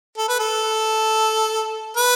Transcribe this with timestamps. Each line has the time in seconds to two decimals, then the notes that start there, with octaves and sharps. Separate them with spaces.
0.18 A4
0.28 B4
0.39 A4
1.97 B4